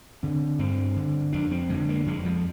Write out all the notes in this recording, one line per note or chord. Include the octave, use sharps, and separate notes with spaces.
D3 C4
G2 C4
D3
F2 D4
C4
D3 G#3
A#3
F2 G#3
F3